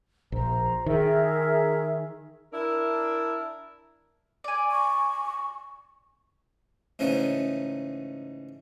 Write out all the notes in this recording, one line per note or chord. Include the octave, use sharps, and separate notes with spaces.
A#1 C5 A#5
D#3 G#4 A#4 E5
D4 E4 A#4
D5 G#5
C#6
G#2 C#3 E3 A3 C#4 D#4